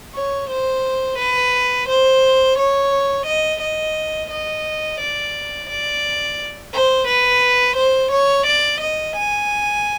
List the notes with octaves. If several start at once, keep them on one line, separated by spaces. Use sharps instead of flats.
C#5
C5
B4
C5
C#5
D#5
D#5
D#5
D5
D5
C5
B4
C5
C#5
D5
D#5
G#5